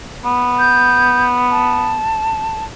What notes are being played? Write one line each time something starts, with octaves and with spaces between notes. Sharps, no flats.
B3
G6
A5